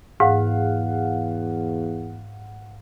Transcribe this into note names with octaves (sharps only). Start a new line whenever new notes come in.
E2 G#2 F5 F#5